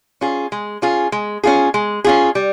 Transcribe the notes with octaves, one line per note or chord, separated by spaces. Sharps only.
C#4 F4 G#4
G#3
C#4 F4 G#4
G#3
C#4 F4 G#4
G#3
C#4 F4 G#4
G3